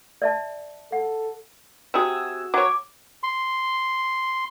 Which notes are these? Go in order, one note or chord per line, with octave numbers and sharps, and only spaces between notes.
D5 E5 A5
A4 F#5
C3 F#4 G#4 E6
F#3 C#5 D6
C6